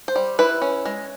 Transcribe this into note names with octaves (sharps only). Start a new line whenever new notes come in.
C5
G3
E4 B4
C#4
G#3